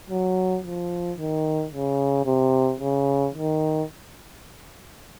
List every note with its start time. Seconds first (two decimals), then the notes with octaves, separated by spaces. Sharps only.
0.10 F#3
0.64 F3
1.18 D#3
1.73 C#3
2.26 C3
2.80 C#3
3.35 D#3